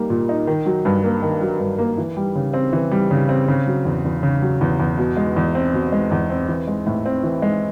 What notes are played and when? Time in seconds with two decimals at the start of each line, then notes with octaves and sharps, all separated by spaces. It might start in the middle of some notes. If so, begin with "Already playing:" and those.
Already playing: G3 A#3 D#4
0.10 A#2
0.29 D#4
0.47 D#3
0.66 F#3
0.85 G2
1.04 A#3
1.22 D#3
1.41 F#3
1.60 G2
1.78 A#3
1.98 E3
2.17 G3
2.36 C#3
2.54 C4
2.73 E3
2.91 G3
3.11 C#3
3.29 C4
3.48 C#3
3.67 F#3
3.85 E2
4.05 E2
4.23 C#3
4.42 F#3
4.61 E2
4.80 E2
4.98 B2
5.17 G#3
5.36 E2
5.55 C4
5.73 B2
5.92 G#3
6.11 E2
6.30 C4
6.48 E3
6.67 G#3
6.87 A2
7.06 C4
7.24 E3
7.42 G#3